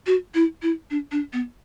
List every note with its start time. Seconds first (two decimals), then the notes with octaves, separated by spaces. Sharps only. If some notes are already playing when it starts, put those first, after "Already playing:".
0.07 F#4
0.34 E4
0.62 E4
0.90 D4
1.12 D4
1.33 B3